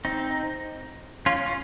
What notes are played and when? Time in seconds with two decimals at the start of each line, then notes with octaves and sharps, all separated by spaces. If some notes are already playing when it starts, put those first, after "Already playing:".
0.05 C4 D#4
1.26 C#4 F4
1.46 C#4 F4